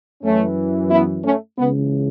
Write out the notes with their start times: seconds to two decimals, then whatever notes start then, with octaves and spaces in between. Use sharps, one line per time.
0.23 F#2 E3 A3 C#4
0.91 B3 E4
1.24 A3 C#4
1.58 C#2 C#3 E3 B3